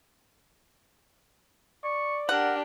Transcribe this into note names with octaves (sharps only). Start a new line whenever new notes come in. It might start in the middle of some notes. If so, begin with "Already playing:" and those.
D5 C#6
D4 G4 A#4 F#5